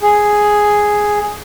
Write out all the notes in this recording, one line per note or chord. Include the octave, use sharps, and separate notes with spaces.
G#4